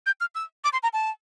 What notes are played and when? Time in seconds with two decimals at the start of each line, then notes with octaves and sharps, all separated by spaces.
0.06 G6
0.21 F6
0.35 E6
0.64 D6
0.73 C6
0.83 A#5
0.93 A5